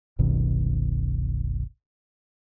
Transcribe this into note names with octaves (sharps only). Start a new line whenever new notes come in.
F#1 C2 B2 D#3